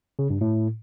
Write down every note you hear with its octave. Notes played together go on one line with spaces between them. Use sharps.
C#3
G2
A2